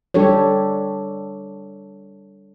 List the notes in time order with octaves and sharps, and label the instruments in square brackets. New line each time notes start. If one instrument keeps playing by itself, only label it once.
[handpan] G3 D4 G4 A4 C#5